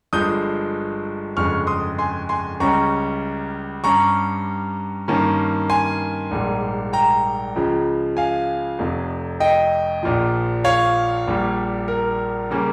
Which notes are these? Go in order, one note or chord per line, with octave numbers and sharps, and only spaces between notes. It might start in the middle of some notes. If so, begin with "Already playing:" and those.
G1 G2 F3 G#3 D#6 G6
G1 F2 C#3 G#3 C#6 F6
C6 D#6
G#5 C6
G#5 C6
C#2 C#3 G3 C#4 A#5 C#6
G2 G3 C#4 A#5 C#6
G2 D#3 A#3 C#4
G#5 C6
A#1 G#2 G3 A#3
G5 A#5
C#2 C#3 F3
F5 G#5
F1 F2 C3
D#5 G5
A#1 A#2 F3
C#5 F5
A#1 A#2 G3
A#4
C#3 G3 A#3 C#4